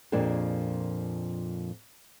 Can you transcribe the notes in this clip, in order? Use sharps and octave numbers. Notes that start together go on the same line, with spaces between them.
F2 A#2 F3 A#3 D4 G#4